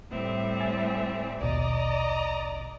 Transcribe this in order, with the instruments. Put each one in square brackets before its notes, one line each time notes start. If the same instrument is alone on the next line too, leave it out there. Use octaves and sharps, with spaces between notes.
[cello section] A2 G3 [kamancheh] C4 E5
[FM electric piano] G#5 A6
[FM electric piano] A#1 D#2 B2 [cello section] D5 [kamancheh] D#5 A#5